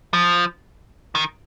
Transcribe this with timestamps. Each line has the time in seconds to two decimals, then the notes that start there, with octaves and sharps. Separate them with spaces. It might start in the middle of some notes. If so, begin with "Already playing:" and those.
0.14 F3
1.15 D#3